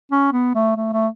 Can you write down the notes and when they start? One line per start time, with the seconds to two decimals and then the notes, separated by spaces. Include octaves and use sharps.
0.11 C#4
0.33 B3
0.55 A3
0.76 A3
0.93 A3